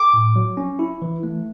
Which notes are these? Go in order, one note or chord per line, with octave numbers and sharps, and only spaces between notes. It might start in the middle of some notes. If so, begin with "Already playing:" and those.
Already playing: D6
A2
F#3
C#4
E4
E3
A3